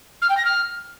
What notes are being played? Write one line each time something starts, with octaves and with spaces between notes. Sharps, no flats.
F6
G5
A#6
F6